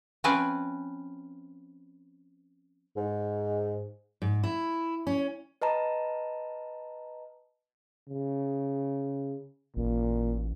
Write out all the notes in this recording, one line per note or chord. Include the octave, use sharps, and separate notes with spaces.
F3 C4 C#4 B4
G#2
G#2
E4
C#4
B4 D#5 A5 A#5
C#3
A1 A#2